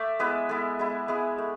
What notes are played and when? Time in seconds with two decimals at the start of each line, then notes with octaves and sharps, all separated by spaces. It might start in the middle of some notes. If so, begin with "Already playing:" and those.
Already playing: A3 D5 E5
0.19 G#3 B3 E4 B4
0.49 G#3 B3 E4 A4
0.79 G#3 B3 E4
1.08 G#3 B3 E4 G#4
1.38 A3